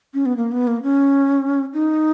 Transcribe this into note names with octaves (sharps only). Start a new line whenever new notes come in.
C#4
B3
A#3
B3
A#3
C#4
D#4